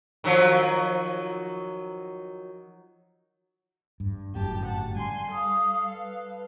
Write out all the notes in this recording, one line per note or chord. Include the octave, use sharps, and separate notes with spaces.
D#3 F3 F#3
G2
G1 F#2 A2 G4 A5
F#5 A5
G3 G#5 C6
A4 F5 D#6
B4